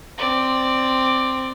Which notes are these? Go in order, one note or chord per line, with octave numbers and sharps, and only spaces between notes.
C4 D5